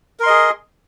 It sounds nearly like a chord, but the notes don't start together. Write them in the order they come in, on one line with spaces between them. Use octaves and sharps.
A#4 C6 D#5 G#4